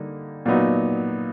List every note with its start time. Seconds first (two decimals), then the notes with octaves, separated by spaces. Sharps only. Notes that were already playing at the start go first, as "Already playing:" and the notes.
Already playing: D3 G3 A#3 D#4
0.46 A#2 F#3 B3 D#4